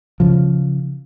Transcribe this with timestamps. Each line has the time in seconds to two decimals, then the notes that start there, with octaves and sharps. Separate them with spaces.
0.20 C#3 F3